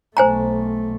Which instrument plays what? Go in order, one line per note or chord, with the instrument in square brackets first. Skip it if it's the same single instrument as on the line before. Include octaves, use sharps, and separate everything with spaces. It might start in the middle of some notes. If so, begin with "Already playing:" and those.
[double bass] B1 A3 [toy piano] C5 G#5 A#5